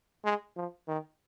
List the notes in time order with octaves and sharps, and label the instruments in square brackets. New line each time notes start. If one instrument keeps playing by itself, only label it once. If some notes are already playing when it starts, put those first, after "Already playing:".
[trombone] G#3
F3
D#3